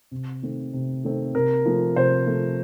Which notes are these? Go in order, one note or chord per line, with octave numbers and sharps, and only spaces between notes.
C3
D#3 A3 C4
C3
D#3 A3 C4
C3 A#4
F3 A3
C3 C5
F3 A3